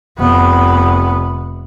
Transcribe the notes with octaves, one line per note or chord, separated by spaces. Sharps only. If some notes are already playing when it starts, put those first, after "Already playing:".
F1 B3